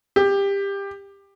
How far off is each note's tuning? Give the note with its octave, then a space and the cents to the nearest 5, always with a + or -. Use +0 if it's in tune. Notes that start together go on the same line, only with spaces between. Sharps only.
G4 +20